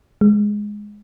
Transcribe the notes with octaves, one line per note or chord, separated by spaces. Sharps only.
G#3